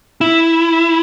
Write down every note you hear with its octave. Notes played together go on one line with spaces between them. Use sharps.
E4